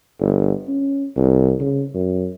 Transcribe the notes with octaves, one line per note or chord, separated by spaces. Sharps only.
G1
C#4
C2
C#3
F#2